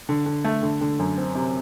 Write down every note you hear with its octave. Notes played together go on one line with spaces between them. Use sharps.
D3
D3
A3
D3
D3
F#2
C4
C3